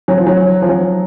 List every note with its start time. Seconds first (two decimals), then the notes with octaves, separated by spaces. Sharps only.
0.08 F#3
0.17 F3
0.27 F#3
0.62 F3
0.69 F#3